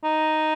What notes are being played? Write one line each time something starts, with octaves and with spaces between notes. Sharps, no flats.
D#4